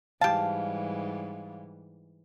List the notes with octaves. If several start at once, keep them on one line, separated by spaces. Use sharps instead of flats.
G#2 E3 G3 G4 F5 A5